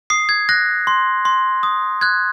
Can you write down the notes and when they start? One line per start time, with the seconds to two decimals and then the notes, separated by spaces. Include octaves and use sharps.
0.10 D#6 C7
0.29 G#6
0.49 F#6 A#6
0.87 C6
1.25 C6
1.63 D#6
2.01 F#6 G#6